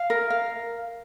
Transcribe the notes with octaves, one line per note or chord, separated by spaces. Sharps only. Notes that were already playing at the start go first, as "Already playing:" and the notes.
Already playing: F5
A#4
F5